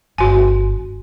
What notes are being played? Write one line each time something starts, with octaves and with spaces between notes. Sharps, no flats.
G1 F#4 G#5